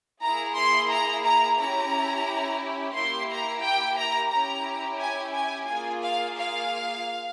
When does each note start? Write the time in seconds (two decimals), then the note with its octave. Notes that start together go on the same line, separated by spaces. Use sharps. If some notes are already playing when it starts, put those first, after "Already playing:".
0.23 A#3 E4 G#4 A#5
0.57 C6
0.91 A#5
1.26 A#5
1.59 C#4 E4 G4 A#5
2.95 A#3 E4 G4 C6
3.30 A#5
3.63 G5
3.97 A#5
4.31 C#4 E4 G4 A#5
5.00 G#5
5.34 G#5
5.67 A#3 F4 G#4 G#5
6.02 F5
6.36 F5